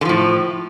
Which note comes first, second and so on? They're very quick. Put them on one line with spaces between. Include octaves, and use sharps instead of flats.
D3 F3 A2